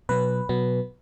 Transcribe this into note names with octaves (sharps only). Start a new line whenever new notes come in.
B2 F#3 B3 B4
B2 F#3 B3